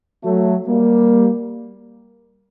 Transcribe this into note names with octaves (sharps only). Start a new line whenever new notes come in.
F#3 A3
G3 A#3